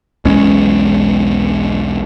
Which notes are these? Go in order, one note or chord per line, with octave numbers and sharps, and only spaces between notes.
B1 E2 G#3 C#4